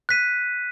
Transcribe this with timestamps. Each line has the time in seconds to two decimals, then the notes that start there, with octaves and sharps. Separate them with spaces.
0.09 F#6 B6 D#7